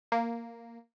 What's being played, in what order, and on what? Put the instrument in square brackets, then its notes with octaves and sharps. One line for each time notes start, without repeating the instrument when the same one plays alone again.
[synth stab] A#3